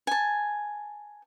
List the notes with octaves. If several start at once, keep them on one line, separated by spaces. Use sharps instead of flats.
G#5 A5